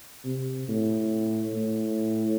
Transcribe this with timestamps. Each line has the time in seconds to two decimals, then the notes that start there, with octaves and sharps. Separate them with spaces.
0.25 C3
0.68 A2
1.54 A2